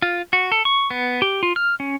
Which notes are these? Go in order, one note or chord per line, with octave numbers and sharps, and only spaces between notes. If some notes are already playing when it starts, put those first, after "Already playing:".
F4
F#4
A4
C#6
B3
G4
F4
F6
C#4